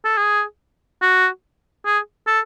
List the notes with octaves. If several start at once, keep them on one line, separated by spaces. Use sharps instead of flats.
A4
G#4
F#4
G#4
A4